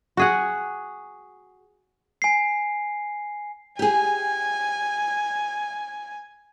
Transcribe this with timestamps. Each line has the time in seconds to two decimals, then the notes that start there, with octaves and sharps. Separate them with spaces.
0.17 F#4 G#4 F#5
2.22 G#5 C7
3.79 G4 G#4 G#5